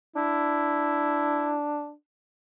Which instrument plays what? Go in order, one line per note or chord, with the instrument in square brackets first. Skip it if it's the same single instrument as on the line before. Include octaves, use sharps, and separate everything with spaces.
[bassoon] D4 [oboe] E4